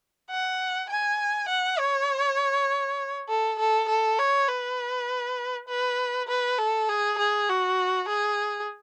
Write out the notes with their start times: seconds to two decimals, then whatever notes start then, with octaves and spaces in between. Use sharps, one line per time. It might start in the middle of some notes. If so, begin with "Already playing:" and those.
0.30 F#5
0.90 G#5
1.49 F#5
1.79 C#5
3.29 A4
3.59 A4
3.89 A4
4.19 C#5
4.49 B4
5.69 B4
6.28 B4
6.58 A4
6.89 G#4
7.19 G#4
7.49 F#4
8.09 G#4